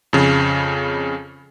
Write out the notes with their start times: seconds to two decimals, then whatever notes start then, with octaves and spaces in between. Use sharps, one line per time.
0.13 F2 C#3